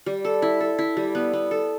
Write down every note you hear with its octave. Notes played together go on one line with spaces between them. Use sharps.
G3
A4
E4
A4
E4
G3
B3
B3
A4